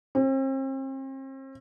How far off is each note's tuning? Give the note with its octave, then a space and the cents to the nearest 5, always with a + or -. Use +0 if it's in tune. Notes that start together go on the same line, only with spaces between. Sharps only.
C4 +40